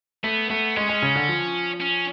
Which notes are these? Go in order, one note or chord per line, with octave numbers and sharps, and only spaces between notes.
A3 B3
A3 B3
G#3 C#4
G#3
C#3
D3
F3
C#4